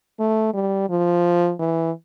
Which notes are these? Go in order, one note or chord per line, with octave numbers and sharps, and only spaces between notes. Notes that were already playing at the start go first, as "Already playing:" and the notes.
A3
G3
F3
E3